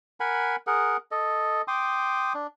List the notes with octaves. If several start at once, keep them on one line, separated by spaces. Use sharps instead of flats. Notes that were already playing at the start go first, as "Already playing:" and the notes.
A#4 F#5 G#5 B5
G#4 A#4 F#5
A4 D#5
G5 C6 D6 D#6
D4